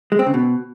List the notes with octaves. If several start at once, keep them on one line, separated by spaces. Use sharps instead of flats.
G#3
C4
C#3
B2